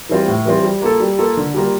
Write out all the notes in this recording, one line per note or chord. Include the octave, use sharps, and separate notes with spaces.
E3 G3 C4 F4
A2
E3 G3 C4 F4
G3
A#3 F4 A4
G3
A#3 F4 A4
D3
G3 A#3 F4 A#4